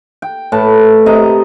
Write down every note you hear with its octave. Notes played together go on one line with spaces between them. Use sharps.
G5
A2 B4 A5
C3 D#5 A#5